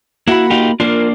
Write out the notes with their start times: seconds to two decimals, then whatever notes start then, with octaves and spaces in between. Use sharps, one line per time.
0.28 A#3 E4 F#4 B5
0.50 D#4 F4 G4
0.80 A#3 D4 F4 A#4 C7